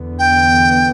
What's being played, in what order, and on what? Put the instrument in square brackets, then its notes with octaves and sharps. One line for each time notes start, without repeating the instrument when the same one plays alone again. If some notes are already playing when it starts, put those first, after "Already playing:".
Already playing: [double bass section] E2 D3 B3
[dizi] G5